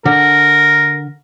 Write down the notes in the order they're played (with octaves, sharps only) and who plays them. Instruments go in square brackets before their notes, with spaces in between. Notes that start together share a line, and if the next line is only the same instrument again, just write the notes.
[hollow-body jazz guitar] D3 [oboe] A#4